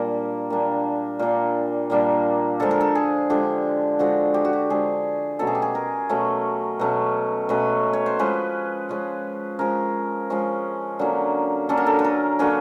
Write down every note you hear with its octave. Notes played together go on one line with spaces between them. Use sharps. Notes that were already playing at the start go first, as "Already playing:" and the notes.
Already playing: A#2 G3 A#3 D4 A#4
A#2 G3 A#3 D4
A#2 G3 A#3 D4
A#2 G3 A#3 D4
D3 F3 G#3 A4
A#4
A4
G#4
D3 F3 G#3 G4
D3 F3 G#3 F#4
G4
F#4
G4
D3 F3 G#3 G#4
B2 F#3 A3 C#4 A4
G#4
G4
G#4
A#4
B2 F#3 A3 C#4
B2 F#3 A3 C#4
B2 F#3 A3 C#4 B4
C#5
C5
F3 G#3 C#4 B4
F3 G#3 C#4
F3 G#3 C#4 A#4
F3 G#3 C#4
D3 F#3 A#3 C#4
D3 F#3 A#3 C#4 A4
A#4
A4
B4
A#4
D3 F#3 A#3 C#4 B4